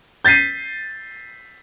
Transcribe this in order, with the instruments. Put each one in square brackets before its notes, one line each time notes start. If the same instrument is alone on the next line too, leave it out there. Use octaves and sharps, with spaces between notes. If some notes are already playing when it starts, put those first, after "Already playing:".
[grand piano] G6 A6 B6 C7 D#7